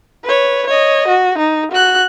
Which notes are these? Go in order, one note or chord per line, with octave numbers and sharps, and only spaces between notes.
B4 C#5
C#5 D#5
F#4
D#4
F#4 F#6